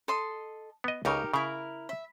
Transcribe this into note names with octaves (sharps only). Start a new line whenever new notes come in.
A4 D#5 C6
B3 D#5
C#2 C#3 D#4 G4 A#4
C#3 E4 A#4
E5